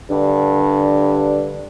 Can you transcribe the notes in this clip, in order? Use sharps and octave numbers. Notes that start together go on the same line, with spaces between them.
G2 D3